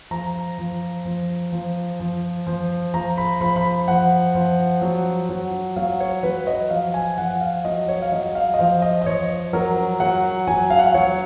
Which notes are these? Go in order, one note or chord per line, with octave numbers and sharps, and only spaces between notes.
F3 A#5
F3
F3
F3
F3
F3
F3 A#5
B5
F3 B5
B5
F3 F#5
F3
F#3
F#3
F#3 F5
C#5
F#3 B4
D#5
F3 F5
G#5
F3 F#5
F5
F#3 D#5
C#5
F5
F#3 D#5
F5
D#5
F3 F5
D#5
D#5
F3 C#5
F#3 A#4
F#3 F#5
F#3 G#5
F5
F#5
F5
F#3 C#5